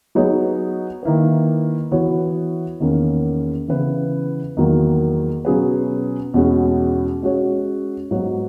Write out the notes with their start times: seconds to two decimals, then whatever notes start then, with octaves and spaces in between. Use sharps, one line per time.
0.15 F#3 B3 D#4 G#4 C#5
1.03 D#3 A#3 E4 B4
1.92 E3 B3 F#4 C#5
2.80 E2 D#3 A#3 C#4
3.68 C#3 E3 B3 E4 B4
4.57 E2 D#3 F#3 A#3
5.45 B2 F#3 C#4 G#4 B4
6.34 E2 B2 G#3 C#4 F#4
7.22 G#3 C#4 F#4 C#5
8.11 G#2 F#3 B3 F#4 C#5